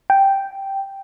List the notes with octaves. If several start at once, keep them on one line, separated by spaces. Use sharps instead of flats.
G5